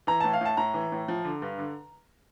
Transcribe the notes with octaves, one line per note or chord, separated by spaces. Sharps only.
E3 A#5
A2 A5
F5
A2 A5
A2 A#5
E3
A2
F3
D3
G2
D3